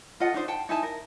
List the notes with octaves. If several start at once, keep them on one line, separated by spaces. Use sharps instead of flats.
F4 A4 D#5 F#5
D4 D#4 C5
F#5 G5 A5
D#4 E4 G#5 A5
A#4